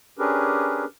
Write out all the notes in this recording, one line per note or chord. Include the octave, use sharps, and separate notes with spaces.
C#4 D4 G4 G#4 A#4 B4